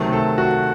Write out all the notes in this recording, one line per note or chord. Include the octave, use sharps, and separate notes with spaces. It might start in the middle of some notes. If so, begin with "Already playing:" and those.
Already playing: C3 D#3 F#3 A3
A4
F#4